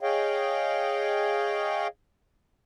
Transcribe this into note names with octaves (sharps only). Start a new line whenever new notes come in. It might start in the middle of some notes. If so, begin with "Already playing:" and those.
G#4 C#5 D#5 F5 G5